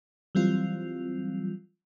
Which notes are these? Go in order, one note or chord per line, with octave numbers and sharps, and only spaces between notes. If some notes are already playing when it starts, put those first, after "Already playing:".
E3 F#3 G3 C4 F4